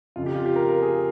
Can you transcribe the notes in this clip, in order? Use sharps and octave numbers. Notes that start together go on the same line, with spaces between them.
F2 C#3 F4
G4
F4
G4
A#4
A#4
G#4